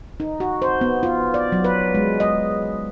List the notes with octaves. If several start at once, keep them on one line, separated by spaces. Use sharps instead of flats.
D#4
F#4
C5
B3
F4
D5
F#3
B4
G#3
D#5